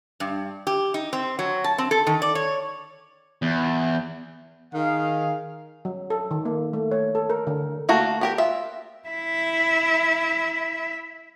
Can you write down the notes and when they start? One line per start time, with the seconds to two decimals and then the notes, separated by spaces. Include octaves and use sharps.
0.20 G2
0.67 G4
0.94 D#4
1.13 C4
1.39 F#3
1.64 A5
1.78 C4
1.91 A4
2.07 D#3
2.22 D5
2.35 C#5
3.42 E2
4.74 D#3 G#4 F5
5.85 F#3
6.10 A4
6.31 D#3
6.45 A#3
6.73 A3
6.91 C#5
7.15 A4
7.30 A#4
7.47 D3
7.89 A3 A#3 F#4
8.21 B3 G4 A#4
8.38 F4 E5
9.09 E4 E5